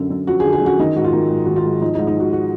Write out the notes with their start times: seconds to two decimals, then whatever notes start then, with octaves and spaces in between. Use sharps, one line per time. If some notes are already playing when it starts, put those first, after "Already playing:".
Already playing: F#2 D3
0.10 F#2
0.27 F3 F#4
0.40 G#4
0.44 D3
0.53 G#4
0.62 F#2 F#4
0.79 D#3 D#4
0.96 G#2 F#4
1.05 F4
1.13 D#3
1.30 G#2
1.45 D#3 F#4
1.56 F4
1.65 G#2
1.81 F3 D#4
1.95 D#4
1.99 G#2
2.07 D#4
2.16 F3 F#4
2.33 F#4